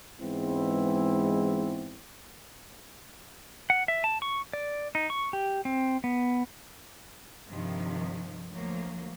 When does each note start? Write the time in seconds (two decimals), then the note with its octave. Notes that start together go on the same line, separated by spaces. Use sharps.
0.21 G#2 E3 G#3 B3 C4 E4
3.70 F#5
3.88 E5
4.04 A5
4.22 C#6
4.53 D5
4.95 D#4
5.10 C#6
5.33 G4
5.65 C4
6.04 B3
7.47 G2 C3 D#3 F3
8.51 D2 F3 F#3 A#3